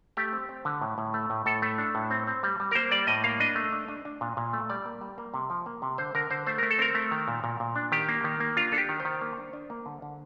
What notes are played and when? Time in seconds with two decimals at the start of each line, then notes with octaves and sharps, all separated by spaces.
0.17 A3 G4
0.33 C4
0.49 C4
0.65 D3
0.81 A2
0.98 A2
1.14 A3
1.30 A2
1.46 A2 A4
1.62 A3
1.78 D4
1.95 A2
2.11 C4
2.27 C4
2.43 G3
2.60 G3
2.71 A#4
2.75 A#3 C5
2.91 G3 D5
3.07 A2 D#5
3.24 A#3 F5
3.40 D4 D#5
3.56 A3
3.72 D4
3.88 D4
4.05 D4
4.21 A#2
4.37 A#2
4.53 A3
4.69 G3 D5
4.86 A#3
5.01 G3
5.18 A#3
5.34 C3
5.50 F3
5.66 A#3
5.82 C3
5.98 D3 C5
6.15 D3 A#4
6.30 D3 C5
6.47 A3 C5
6.58 A3 A#4
6.71 A4
6.79 C4 A#4
6.95 A3
7.11 D#3
7.28 A#2
7.44 A#2
7.60 A#2
7.75 D4
7.92 D#3 G4
8.09 A#3
8.24 D#3
8.40 A#3
8.57 D4 F4
8.72 D4 A4
8.78 G4
8.89 D#3
9.00 C5
9.05 D#3
9.22 A#3
9.37 D4
9.53 D4
9.70 A#3
9.86 D3
10.02 D3